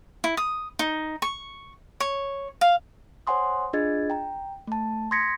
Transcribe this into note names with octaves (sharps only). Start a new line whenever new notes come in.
E4
D#6
D#4
C#6
C#5
F5
C5 C#5 F#5 G#5 C6 D#6
D4 F4 G#4 D#5 G#6 A6
G5 A#5
A3 A5
C6 D#6 G#6 A#6 B6 C#7